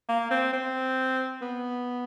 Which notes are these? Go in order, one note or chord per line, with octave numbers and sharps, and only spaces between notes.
A#3
C4
C4
B3